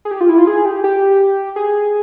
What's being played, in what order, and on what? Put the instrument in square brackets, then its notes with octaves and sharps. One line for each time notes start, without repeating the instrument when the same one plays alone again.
[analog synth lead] G#4
G4
F4
E4
F4
G#4
G4
G4
G#4